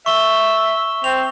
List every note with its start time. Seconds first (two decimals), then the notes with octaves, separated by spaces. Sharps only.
0.06 E5 C#6 G7
1.04 C4 F7